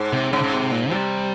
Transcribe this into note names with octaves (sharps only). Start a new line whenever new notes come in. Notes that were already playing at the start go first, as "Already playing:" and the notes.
Already playing: G#2
C3
G#2 C#3
C#3
C3
A#2
C3 G3